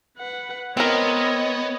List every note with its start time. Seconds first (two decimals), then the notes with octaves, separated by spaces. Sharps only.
0.18 B4 F#5
0.77 B3 C4 A#4 C#5 D#5